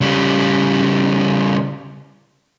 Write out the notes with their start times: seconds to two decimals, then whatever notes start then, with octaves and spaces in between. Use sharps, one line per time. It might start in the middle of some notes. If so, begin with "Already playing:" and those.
0.01 C#3 G3